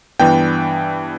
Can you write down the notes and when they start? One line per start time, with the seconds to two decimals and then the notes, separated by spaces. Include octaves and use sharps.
0.20 G2 E3 B3 D4 G5